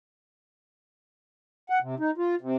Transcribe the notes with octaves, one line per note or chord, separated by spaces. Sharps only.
F#5
C3
D#4
F4
C3